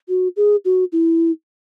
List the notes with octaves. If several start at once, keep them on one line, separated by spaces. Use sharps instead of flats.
F#4
G#4
F#4
E4